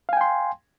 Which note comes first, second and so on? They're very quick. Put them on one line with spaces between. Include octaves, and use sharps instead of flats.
F5 G#5 G5 C6